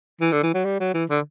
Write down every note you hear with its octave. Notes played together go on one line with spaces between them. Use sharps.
E3
D3
E3
F#3
G3
F#3
E3
D3